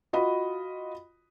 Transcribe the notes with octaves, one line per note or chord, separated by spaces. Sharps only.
F4 F#4 D#5 B5